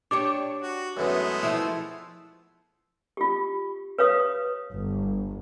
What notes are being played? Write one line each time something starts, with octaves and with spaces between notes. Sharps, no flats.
D4 G4 C#5 D6
F#4
F#2 E3 G#3 A3 B3
F3 E4
F4 G4
B4 C#5 F5 D#6
G1